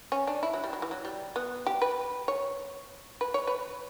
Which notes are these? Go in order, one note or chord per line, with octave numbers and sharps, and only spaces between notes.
C#4
D4
E4
F#3
G3
F#3
E3
F#3
G3
B3
G4
B4
C#5
B4
C#5
B4